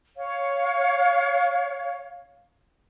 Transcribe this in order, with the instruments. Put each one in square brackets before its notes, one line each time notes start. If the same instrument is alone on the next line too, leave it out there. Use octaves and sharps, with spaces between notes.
[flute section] C#5 F5